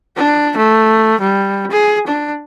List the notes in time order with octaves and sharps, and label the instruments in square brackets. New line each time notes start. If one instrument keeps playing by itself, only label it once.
[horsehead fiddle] D4
A3
G3
G#4
D4